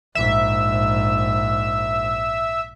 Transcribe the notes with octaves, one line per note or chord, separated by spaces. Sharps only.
A#1 G#2 E5